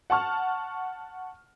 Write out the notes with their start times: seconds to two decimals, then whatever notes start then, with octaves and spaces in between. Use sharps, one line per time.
0.10 F#5 A5 C#6 F6